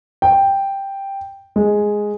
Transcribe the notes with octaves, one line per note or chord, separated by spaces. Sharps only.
G5
G#3